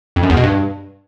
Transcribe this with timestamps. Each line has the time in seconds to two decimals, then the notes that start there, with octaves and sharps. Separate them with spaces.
0.16 F2
0.23 F#2
0.30 E2
0.37 B2
0.44 G2